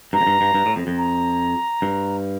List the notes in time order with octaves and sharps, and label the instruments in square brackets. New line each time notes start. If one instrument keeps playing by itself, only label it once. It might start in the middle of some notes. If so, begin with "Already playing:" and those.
[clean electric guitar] G2 [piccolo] A#5
[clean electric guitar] F2
G2
G2
G2
A2
F2
F2
[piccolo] A#5
[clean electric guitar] G2